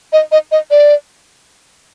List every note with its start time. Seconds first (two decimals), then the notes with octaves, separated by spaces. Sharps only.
0.13 D#5
0.32 D#5
0.52 D#5
0.71 D5